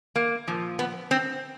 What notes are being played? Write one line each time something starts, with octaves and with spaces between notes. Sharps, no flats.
A#3
A#2 F3
B3
C4